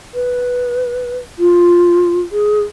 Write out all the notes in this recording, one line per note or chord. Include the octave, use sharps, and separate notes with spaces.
B4
F4
G#4